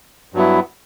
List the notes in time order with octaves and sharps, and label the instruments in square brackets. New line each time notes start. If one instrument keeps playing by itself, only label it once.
[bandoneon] G2 F#3 B3 E4